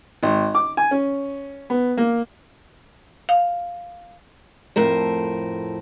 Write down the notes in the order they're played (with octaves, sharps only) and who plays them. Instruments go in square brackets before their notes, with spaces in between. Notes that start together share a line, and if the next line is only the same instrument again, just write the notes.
[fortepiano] G#1
D6
G#5
C#4
B3
A#3
[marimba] F5
[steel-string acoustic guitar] F2 A2 A#4 C5